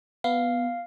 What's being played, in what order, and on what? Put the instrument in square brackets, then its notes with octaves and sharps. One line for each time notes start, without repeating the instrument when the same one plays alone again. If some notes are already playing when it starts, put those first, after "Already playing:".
[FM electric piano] B3 [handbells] F5